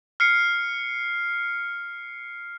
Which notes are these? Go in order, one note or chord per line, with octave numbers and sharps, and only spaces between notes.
F6 C7 C#7